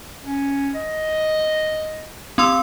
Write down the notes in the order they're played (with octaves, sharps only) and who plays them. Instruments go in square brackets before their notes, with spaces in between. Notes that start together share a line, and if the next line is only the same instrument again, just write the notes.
[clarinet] C#4
D#5
[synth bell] C4 C6 E6 [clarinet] G4